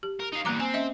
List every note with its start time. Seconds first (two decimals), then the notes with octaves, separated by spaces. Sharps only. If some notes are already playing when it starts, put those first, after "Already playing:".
0.03 G4
0.20 A#4
0.33 D#4 F5
0.45 E2 G2 A#3 A#5 D6
0.60 C4 G#5
0.73 C#4 D#5 E5